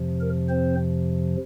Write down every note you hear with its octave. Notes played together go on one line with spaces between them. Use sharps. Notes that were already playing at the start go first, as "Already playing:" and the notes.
Already playing: F2 C3 F3
A#4
C4 C5